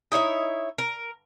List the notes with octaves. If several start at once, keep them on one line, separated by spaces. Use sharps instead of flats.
D#4 E4 C#5 E5
A#4